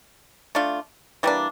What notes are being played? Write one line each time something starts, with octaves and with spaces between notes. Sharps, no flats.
A3 D4 F4
E3 G3 A#3 D4